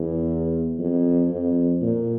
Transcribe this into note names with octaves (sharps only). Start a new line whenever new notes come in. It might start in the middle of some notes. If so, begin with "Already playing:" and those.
Already playing: E2
F2
F2
A#2